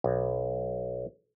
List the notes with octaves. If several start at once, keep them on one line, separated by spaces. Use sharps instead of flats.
B1